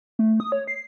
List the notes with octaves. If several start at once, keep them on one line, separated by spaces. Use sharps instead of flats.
A3
D#6
C#5
C7